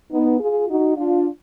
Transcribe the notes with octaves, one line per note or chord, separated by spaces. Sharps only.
B3 D#4
F4 G#4
D#4 F#4
D4 F4